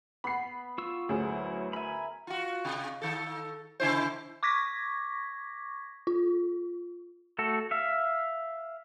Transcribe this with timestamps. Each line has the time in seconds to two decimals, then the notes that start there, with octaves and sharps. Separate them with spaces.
0.24 B3 B5 C7
0.78 F4 C#6 E6
1.09 D2 F#3 C#4 E4 G#4 F#5
1.73 A#4 E5 G#5 B5
2.27 F4 F#4
2.65 C3
3.02 D#3 A4
3.80 C#3 E4 C5
4.43 C#6 D6 G#6 A#6 B6
6.07 F4
7.38 A3 F#4 A4
7.71 E5 F5